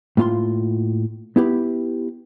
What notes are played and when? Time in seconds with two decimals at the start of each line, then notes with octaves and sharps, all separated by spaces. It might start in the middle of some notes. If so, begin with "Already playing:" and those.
0.17 A2 A#3 F4 A5 C6
1.36 B3 E4 G4 B4